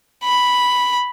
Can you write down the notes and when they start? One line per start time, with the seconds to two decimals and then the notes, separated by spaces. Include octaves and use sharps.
0.24 B5